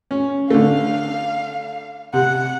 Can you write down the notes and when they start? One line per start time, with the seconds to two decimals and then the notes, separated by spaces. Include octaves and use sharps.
0.11 C#4
0.50 D3 A3 F5
2.13 C3 F#5